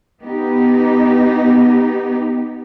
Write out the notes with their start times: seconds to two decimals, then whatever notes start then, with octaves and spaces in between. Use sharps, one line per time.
0.23 B3 D#4 G4